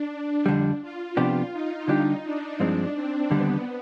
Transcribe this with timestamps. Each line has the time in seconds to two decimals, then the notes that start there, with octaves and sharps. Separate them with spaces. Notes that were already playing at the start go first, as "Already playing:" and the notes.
Already playing: D4
0.46 F2 D3 G3
0.82 F4
1.17 C3 F3 B3 D4 F4 G4
1.53 D#4
1.88 D3 G3 D4 G4
2.24 D4
2.60 G2 F3 G#3 C4
2.95 C4
3.30 D#2 D3 G3 B3